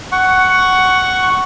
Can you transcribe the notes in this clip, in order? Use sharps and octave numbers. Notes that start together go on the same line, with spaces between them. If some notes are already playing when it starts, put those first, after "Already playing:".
F#5 C#6